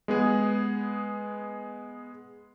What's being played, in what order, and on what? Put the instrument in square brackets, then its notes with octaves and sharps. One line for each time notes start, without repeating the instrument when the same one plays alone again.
[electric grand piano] G#3 B3 G#4